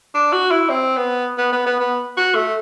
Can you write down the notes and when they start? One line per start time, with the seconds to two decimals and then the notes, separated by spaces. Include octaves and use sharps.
0.14 D4
0.33 F#4
0.51 E4
0.69 C4
0.97 B3
1.38 B3
1.52 B3
1.66 B3
1.80 B3
2.17 F#4
2.35 A3